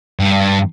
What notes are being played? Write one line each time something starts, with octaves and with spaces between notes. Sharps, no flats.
G2